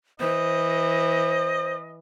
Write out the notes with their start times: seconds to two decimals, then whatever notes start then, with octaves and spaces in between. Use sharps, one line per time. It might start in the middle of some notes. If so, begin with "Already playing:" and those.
0.20 E3 C5 D#5